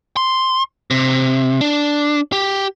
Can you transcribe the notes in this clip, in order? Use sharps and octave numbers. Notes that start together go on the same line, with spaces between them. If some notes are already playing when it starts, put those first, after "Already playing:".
C6
C3
D4
G4